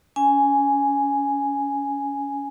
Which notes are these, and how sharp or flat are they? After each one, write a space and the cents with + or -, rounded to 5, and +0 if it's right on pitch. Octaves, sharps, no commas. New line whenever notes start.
C#4 +25 G#5 +0